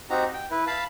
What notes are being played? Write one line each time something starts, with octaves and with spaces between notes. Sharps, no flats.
C4 D#4 F#4 G4 A#5
G5
E4 B4
F5 A5 B5